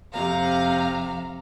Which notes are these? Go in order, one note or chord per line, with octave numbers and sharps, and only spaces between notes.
F2 C3 F5 A#5